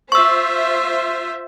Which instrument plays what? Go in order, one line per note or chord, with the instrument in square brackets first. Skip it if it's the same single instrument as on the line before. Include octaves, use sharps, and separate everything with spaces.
[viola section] F4 C5 E5 [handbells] C#6 E6